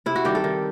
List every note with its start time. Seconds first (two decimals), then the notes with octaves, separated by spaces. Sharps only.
0.06 C3 E4
0.16 F#4
0.25 D#3 G3 G4
0.35 A4
0.44 D#3